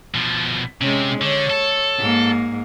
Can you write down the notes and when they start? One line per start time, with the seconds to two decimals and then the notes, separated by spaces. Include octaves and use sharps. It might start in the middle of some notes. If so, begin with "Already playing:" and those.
0.15 B2 F3
0.81 C3 G#3 C#4
1.21 D3 C#5
1.50 A4
1.99 G#2 A#3